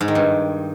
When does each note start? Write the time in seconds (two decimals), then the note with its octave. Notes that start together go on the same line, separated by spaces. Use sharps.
0.01 G#2
0.08 D#3
0.15 G2